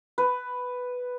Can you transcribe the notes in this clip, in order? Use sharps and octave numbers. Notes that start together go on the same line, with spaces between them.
B4